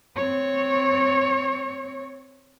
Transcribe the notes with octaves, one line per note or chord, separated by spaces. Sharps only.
C4 C#5